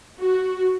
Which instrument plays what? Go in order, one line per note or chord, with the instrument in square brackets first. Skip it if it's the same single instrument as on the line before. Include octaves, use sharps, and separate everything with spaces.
[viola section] F#4